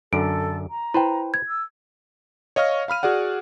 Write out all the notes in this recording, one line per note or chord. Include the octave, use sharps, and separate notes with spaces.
F#2 D3 A4 D7
A#5
E4 B4 C5 G5
G#6
E6
C#5 D#5 F5 C#6 F6 A#6
F5 B5 F6 D#7
F#4 G#4 D5 F#5